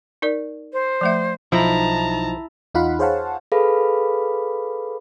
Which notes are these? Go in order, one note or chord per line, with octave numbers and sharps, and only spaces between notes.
D#4 A#4 D5
C5
F3 A3 E5
B1 F3 D#4 E4 A5 A#5
E2 D#4 F4 F5 F#5 B5
G#4 C5 C#5 F5 F#5 A5
G#4 A4 B4 F5 B5